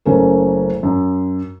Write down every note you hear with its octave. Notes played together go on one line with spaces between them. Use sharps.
F#1 A3 C#4 A#4
F#2